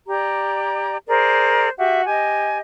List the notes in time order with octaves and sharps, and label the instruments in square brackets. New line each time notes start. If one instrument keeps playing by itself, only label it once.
[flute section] G4 D5 A#5
G#4 A#4 C5 D5
F#4 G4 E5
G4 D#5 G#5